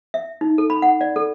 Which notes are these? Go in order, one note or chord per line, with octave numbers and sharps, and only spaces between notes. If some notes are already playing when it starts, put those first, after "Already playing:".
E5
D#4
A4
B5
F#5
D5
A4